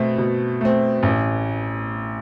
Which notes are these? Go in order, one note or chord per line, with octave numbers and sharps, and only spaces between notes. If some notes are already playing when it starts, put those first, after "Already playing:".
Already playing: B2 A3 C4
B2
A3 C4
A1